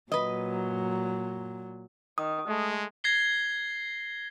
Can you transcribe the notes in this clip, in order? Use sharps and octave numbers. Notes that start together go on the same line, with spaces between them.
A#2 F#3 B4 D#5
D#3 D#6
G#3 A3
G#6 A#6 C7 G7